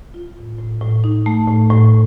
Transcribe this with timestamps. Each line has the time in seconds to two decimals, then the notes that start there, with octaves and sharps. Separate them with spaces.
0.14 F4
0.37 A2
0.58 A2
0.81 A2
1.04 D#4
1.26 A3
1.48 A2
1.70 A2